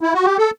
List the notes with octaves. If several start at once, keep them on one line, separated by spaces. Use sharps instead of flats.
E4
F#4
G4
A4